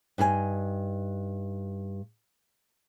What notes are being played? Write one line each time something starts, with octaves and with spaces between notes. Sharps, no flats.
G2 D#4 G#4 G#5